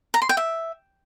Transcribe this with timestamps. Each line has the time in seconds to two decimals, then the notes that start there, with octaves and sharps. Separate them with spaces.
0.14 A#5
0.22 C6
0.29 G5
0.37 E5